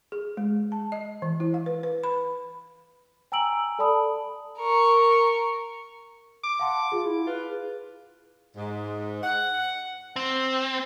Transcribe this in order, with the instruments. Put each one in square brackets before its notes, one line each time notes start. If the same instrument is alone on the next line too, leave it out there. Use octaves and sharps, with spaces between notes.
[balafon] G#4
G#3
A5
D#5
E3
E4
F5
B4
B4
B5
[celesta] G5 G#5 A#5 E6 D7 F#7
A4 D5 A5 B5 D#6
[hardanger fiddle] A#4 C#6
[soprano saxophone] D6
[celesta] F5 A5 C6 [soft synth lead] F#5
[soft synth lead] F4 [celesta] G#4
[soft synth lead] E4
[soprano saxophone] F4 [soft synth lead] B4
[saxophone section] G#2
F#5
[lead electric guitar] C4